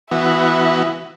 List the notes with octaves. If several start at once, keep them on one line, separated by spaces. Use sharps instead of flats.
E3 B3 F#4 E5